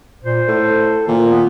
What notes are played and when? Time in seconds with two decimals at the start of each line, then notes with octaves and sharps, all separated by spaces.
0.24 A#2 C5
0.48 A2 A4
1.08 A#2 D#3
1.31 B3